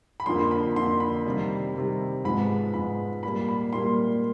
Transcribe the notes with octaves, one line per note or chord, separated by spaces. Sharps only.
B5
F2 D3 F3 A#3 C6
B5
F2 D3 F3 A#3 C6
B5
C3 D#3 G3
C3 D#3 G3
G#2 F3 G#3 B3 B5
G#2 F3 G#3 B3 B5
A#2 G3 A#3 B5
B5
A#2 G3 A#3 C6